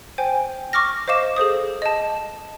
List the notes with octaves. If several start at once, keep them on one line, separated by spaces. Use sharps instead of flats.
C5 G5 G#5
C#6 D6 F6 A#6
C5 D#5 F5 D6 E7
G#4 A4 C5 D#6
D#5 A5